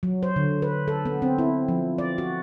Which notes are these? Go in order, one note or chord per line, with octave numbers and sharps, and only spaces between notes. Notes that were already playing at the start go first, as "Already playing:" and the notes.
F#3
C5
D3
B4
A4
B3
C4
E4
F3
D5
F#4